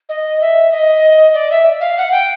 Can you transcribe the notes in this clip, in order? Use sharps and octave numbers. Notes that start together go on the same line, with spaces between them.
D#5
E5
D#5
D5
E5
F5
F#5
G5